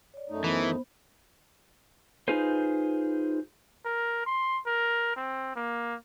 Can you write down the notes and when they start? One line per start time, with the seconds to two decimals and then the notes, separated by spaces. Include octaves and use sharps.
0.14 C#5 D5
0.30 F#2 A3 D#4
0.44 E3 B3 C5
2.28 D#4 F4 G#4 B4 C5
3.85 A#4
4.26 C6
4.66 A#4
5.16 C4
5.56 A#3